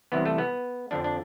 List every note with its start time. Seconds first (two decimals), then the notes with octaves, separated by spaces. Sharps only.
0.12 C2 C3 E3 B3
0.25 A3
0.38 B3
0.91 F2 D3 F3 D4
1.04 D4